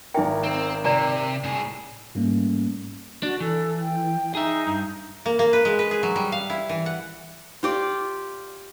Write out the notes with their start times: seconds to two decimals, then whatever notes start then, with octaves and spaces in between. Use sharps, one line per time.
0.14 G#1 D#4 A#4 E5 G5
0.44 C4
0.85 C3 D5 A#5
1.44 A2 G#4
2.15 G#2 G3 A3 A#3 C#4
3.23 D4 F#4
3.40 E3 A4
3.80 G5
4.35 D#4 G#4 E5
4.66 G2
5.26 A#3
5.39 A#3
5.53 B4
5.65 G#3
5.79 B4
5.91 G#4
6.03 F#3
6.16 G3
6.32 F5
6.50 E4
6.69 E3
6.86 F#5
7.63 F4 G4 D5